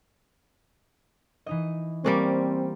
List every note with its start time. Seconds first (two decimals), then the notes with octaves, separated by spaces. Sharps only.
1.46 E3 D#4 D#5
2.04 G3 A#3 C4 C#4 C5 D5